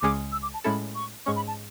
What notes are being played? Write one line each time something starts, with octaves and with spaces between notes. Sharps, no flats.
C#2 C#3 G#3 C#4 G#4 D6
E6
D6
A5
A2 G#3 C#4 E4 A4 B5
C#6
G#2 G#3 C#4 C#6
B5
A5